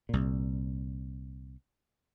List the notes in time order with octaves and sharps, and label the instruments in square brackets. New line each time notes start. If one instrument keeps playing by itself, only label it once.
[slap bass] C2 A#2